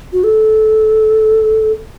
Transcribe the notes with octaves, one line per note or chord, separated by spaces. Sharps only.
F#4
A4